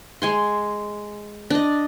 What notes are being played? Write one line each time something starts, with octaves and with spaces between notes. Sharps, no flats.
G#3 G#5 C6
D4 D#5